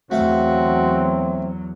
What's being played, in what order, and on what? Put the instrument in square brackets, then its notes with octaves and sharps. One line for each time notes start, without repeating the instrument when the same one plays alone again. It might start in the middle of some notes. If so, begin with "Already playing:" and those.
[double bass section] E2 F#3 [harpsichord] A3 F5 [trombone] C4 [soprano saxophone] F#4